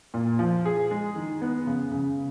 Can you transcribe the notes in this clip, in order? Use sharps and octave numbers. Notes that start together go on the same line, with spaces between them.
A#2
F3
G#4
G#3
D#3
B3
C#3
C#3